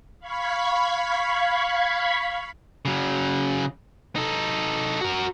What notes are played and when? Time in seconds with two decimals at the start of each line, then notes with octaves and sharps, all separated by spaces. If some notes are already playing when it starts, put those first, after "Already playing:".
0.20 F5 B5 C#6 G#6 B6
2.85 C#3 F#3
4.16 D#4 A4
5.01 F#4 A#4